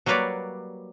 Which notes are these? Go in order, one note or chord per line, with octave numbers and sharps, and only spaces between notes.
F#3 G3 A#3 B4 C#5 D5